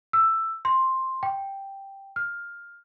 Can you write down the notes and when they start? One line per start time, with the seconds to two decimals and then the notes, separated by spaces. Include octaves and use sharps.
0.13 E6
0.65 C6
1.23 G5
2.16 F6